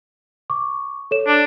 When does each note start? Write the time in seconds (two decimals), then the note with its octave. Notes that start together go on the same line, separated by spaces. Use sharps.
0.50 C#6 D6
1.11 A4 C#5 E7
1.27 D4